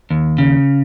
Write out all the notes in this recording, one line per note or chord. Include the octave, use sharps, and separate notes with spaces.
D#2
C#3